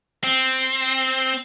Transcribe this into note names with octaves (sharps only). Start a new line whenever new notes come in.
C4